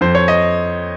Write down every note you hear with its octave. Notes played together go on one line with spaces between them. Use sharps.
F2 C5
C#5
D#5